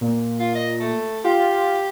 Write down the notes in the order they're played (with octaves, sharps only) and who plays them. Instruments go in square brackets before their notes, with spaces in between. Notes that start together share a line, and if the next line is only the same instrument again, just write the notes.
[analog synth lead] A#2
[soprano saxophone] F4
D#5
A3
[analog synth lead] F4 [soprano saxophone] G4